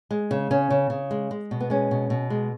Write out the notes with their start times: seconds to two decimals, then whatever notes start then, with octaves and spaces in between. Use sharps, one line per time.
0.11 G#3
0.31 C#3
0.51 C#3 C#4
0.70 C#3
0.90 C#3
1.11 G#3
1.31 G#3
1.51 B2
1.60 B3
1.70 G#3 C#4
1.91 B2
2.10 B2
2.30 G#3